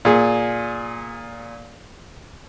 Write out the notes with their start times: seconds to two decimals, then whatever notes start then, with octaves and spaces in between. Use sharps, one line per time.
0.05 A#2 G#4